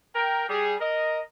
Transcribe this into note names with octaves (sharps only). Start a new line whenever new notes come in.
A#4 G5
G3 G#4
A#4 D#5